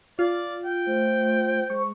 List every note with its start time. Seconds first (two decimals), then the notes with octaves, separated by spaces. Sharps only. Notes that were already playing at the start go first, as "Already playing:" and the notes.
0.19 F4 D5
0.65 G5
0.87 A3 C5
1.70 G#3 C#6